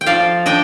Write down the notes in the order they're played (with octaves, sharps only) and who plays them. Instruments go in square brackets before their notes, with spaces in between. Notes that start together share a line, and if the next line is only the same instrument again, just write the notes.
[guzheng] G5
F3 D5 F5
D4 D#5 G5